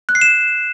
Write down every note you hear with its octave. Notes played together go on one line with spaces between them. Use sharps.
F#6
C7
E7